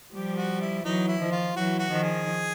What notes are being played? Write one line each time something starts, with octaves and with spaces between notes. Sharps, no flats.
F3 G3 G4
F#4
E4
E3 F#3 D#4
E4
D#3 F3
F4
E3 F#3 F#4
F#4
D#3 F3
G#4